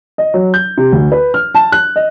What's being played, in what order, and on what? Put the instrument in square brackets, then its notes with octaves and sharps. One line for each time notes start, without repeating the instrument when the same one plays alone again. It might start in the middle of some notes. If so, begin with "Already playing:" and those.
[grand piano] D#5
F#3
G6
C3
D2
B4
F6
A5
F#6
D#5